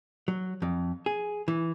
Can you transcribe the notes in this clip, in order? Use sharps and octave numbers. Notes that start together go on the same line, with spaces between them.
F#3
F2
G#4
E3